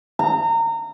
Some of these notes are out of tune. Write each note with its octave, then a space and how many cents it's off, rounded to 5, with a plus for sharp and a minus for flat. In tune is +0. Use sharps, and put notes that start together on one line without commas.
A#5 -25